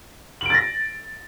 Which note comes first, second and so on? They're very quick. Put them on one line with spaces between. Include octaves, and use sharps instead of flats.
F#7 D7 A6 A#6